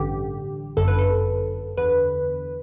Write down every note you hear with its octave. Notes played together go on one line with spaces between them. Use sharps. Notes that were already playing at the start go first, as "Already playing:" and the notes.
Already playing: A1 G2 D3 G4
G1 F#2 D3 A4
B4
A4
E2 D3 B4